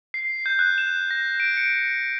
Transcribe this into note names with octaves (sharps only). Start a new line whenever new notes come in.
C7
G6
F#6
E7
A#6
D7
C#7